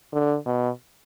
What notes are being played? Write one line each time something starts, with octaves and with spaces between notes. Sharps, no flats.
D3
B2